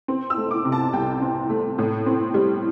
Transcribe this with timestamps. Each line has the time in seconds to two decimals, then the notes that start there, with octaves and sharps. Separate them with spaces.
0.08 C4
0.30 E6
0.37 A3
0.51 D6
0.65 C3
0.72 A5
0.93 C2 G5
1.22 C4
1.50 A3
1.78 A2
2.06 C4
2.34 G3